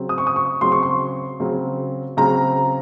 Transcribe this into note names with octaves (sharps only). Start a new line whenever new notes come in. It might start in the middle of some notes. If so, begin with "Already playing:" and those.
Already playing: C#3 F#3 C4
D#6
C#6
D#6
C#6
C#3 F#3 C4 C6
C#6
C6
C#3 F#3 C4
C#3 F#3 C4 A#5